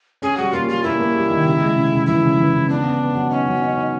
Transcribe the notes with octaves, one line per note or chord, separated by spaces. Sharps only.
C#4 G#4
G3 F#4
A#3 F4
G3 F4
A#3 E4
A#3
G3
D#3
C#3
G#3
C#3
C#3
E3 E4
C#3
E3
C#3
B3 D4
B3
B3
F#3
C#4 D#4
F#3
D#4
D#4